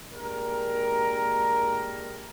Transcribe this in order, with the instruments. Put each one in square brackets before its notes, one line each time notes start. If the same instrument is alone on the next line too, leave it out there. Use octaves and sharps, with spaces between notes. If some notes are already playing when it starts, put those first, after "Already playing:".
[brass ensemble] A#2 G#3 D4 G4 A#4